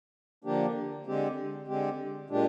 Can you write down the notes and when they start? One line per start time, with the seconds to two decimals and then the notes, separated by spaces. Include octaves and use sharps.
0.44 D3 F3 A#3 D4 G4
1.06 D3 G#3 C4 G4
1.68 D3 G#3 C4 G4
2.30 A#2 G#3 D4 G4